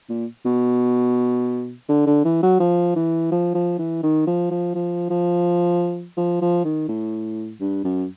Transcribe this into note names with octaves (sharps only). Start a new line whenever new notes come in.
A#2
B2
D3
D3
E3
F#3
F3
E3
F3
F3
E3
D#3
F3
F3
F3
F3
F3
F3
D#3
A2
G2
F#2